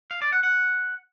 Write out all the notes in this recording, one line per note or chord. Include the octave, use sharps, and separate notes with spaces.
F5
D5
F#5
F#5